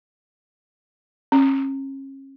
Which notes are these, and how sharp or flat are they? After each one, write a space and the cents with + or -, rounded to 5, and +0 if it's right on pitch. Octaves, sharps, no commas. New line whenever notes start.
C#4 -35